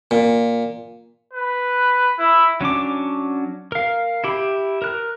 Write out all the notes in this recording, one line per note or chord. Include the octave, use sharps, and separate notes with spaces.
A#2
B4
E4
F#3 C#4 D4 D6
A#4 F5
E4 G4 B5
A#4 F#6